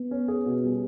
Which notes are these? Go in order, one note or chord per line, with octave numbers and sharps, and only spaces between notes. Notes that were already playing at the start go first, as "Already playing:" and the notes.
Already playing: B3
C#4
G#4
B2
G3